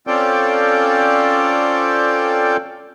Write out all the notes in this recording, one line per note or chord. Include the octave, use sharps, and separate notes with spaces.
C4 C#4 F4 A4 D5 G5